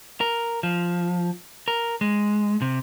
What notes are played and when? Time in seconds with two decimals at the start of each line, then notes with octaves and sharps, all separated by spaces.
0.21 A#4
0.63 F3
1.68 A#4
2.01 G#3
2.62 C3